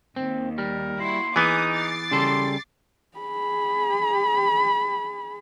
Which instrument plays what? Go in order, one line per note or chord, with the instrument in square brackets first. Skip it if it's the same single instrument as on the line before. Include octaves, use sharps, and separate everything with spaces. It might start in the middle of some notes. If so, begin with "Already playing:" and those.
[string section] D#2 [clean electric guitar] C4
[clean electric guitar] G3 [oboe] A#4
[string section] A#3 E4 F#4 [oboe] C6
[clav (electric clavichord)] E3 B3 [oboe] D#4 [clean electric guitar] G#4 [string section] D6 D#6
[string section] D6 A6 C7
[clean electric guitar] C#3 G3 A4 [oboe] C6
[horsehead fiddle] G#4 B5